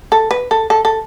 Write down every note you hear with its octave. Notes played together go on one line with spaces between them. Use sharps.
A4
B4
A4
A4
A4